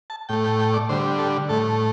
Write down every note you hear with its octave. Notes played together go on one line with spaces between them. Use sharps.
A5
A2 A3 G5
G5
G5
D5
D3 G3 C5
A4
A2 A3 A4